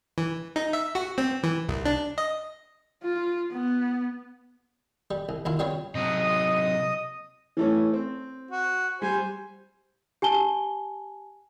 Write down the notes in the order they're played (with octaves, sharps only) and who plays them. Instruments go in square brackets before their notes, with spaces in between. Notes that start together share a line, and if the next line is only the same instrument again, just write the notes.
[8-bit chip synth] E3
D#4
E5
F#4
C4
E3
C2
D4
D#5
[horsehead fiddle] F4
B3
[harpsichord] G3
C2
D#2 E4 F4
G3 C4 F4 C#5
[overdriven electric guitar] C3 F#3 [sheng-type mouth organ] D#5 D#6
[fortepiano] E3 A3 C#4
C4
[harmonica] F#4
[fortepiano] G3 [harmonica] C5 G#5
[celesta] G4 G#5 A5 G7